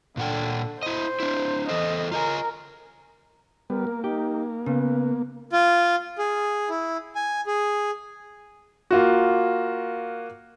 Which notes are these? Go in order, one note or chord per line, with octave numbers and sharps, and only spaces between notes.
A#2 D3 F#5 G5
E4 C5 D#5
D4 E4
E3 A4 C5 D#5
F4 A#4 D#5 G#5
G3 B3 A#4
A#3
D#4 G4
C#3 B3 B4
F4
G#4
E4
G#5
G#4
A#3 F4 F#4